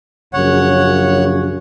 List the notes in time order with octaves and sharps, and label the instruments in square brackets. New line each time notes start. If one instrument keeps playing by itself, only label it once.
[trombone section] A#1 F#2 C#3 [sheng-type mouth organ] C#5 F#5